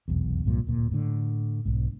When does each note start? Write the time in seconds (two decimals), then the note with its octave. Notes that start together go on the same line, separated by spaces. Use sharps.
0.08 F1 B1 E2
0.45 C2 G2 A#2 F3
0.67 D1 A#2
0.92 A2 D3
1.65 B1 G#2